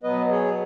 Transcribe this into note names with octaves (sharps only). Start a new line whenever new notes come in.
B2 F#3 B3 B4 D#5
G#4 C#5